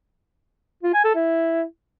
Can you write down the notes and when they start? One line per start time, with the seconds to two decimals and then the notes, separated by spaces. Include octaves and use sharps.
0.83 F4
0.94 G#5
1.04 A4
1.15 E4